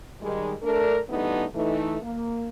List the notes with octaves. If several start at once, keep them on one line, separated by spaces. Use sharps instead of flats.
D#3 G3 G#3
A3 D4 A#4
E3 G3 A3 B3 D4 D#4
E3 A3 D#4
A#3